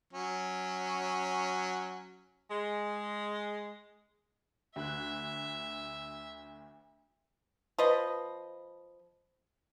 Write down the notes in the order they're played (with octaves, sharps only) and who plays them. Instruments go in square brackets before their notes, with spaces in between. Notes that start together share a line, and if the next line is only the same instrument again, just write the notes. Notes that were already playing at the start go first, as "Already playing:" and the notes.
[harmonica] F#3 C#4
[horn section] G#3
[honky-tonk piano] D2 F#6 [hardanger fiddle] E5
[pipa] F3 B4 D#5